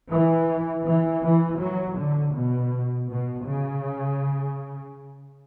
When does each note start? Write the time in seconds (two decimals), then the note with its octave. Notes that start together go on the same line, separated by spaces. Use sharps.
0.11 E3
0.85 E3
1.23 E3
1.59 F#3
1.97 D3
2.34 B2
3.09 B2
3.46 C#3